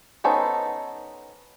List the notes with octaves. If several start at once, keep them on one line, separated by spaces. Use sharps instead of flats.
B3 C#4 D#4 A4 C5